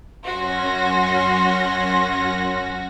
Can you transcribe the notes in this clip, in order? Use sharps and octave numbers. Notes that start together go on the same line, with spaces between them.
F#2 C#4 F#4 C6 A#6